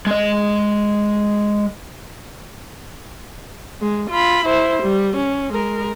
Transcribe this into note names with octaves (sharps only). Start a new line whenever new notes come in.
G#3 D#5
G#3
F4 B5
E4 C5
G3
C#4
G#3 A#4